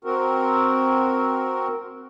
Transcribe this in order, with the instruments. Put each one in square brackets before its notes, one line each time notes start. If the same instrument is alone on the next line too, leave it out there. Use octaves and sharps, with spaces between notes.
[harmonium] C4 F#4 A#4